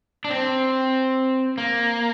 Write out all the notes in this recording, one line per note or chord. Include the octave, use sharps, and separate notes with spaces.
D4
C4
A#3